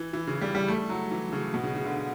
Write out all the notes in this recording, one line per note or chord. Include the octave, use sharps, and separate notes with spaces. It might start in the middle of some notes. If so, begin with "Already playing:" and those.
Already playing: E3
E3
C#3
G3
G3
A3
F#3
E3
C#3
B2
C#3
C#3
D3